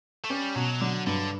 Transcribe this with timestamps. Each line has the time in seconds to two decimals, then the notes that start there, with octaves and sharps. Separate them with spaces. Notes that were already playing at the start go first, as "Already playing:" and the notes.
0.24 A3
0.30 G3 C#4
0.55 B2 F#3
0.81 D3 F#3
1.06 G2 D3